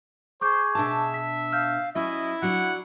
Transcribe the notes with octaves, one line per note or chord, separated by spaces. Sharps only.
G#4 C5 C#6 D6 G6
B2 D4 E5 A5
B6
F5 F6 G6
F#3 C#4 E4 D#5 E5
F#3 D4 F#5